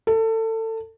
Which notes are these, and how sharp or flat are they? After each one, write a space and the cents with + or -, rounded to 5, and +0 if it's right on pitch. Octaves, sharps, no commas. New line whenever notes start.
A4 +25